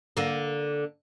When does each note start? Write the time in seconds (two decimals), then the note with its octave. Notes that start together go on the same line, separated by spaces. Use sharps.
0.17 D3 A#3